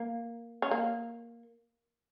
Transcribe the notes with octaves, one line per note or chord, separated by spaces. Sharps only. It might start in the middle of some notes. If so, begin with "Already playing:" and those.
Already playing: A#3
C#4
A#3